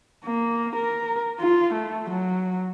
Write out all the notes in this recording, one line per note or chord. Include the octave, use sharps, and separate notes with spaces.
A#3
A#4
F4
A3
F#3